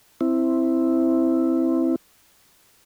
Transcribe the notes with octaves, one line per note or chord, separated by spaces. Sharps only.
C4 E4